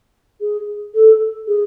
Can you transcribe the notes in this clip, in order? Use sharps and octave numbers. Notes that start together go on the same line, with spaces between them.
G#4
A4
G#4